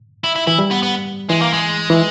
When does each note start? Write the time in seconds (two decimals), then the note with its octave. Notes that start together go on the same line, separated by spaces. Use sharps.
0.24 E4
0.35 E4
0.47 E3 E4
0.59 G3
0.71 B3
0.83 B3
1.30 E3 G#3
1.42 A#3
1.53 G#3
1.90 E3